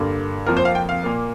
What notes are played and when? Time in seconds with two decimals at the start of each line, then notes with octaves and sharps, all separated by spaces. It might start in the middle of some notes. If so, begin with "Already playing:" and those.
Already playing: G2 D3 A#3
0.46 F2 F3 A#3 A#4
0.57 C5
0.65 F5
0.75 G5
0.89 F5
1.03 A#2 A#3